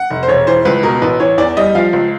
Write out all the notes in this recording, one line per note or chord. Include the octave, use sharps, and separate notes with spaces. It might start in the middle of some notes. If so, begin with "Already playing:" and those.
Already playing: F#5
F1
C5
E1 C#5
E3 C5
C#2 B4
B2 A#4
A1 B4
E3 C#5
E2 D5
G3 D#5
F3 F5
C#2